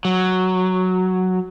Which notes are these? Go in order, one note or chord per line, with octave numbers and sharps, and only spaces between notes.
F#3